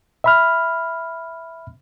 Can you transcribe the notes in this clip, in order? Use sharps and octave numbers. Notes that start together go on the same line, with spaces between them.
E5 B5 F6